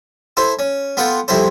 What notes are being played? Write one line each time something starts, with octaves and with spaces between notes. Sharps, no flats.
E4 A4 C5
C#4
B3 F4 A4 F#5 G5
C2 F2 E4 A4 C5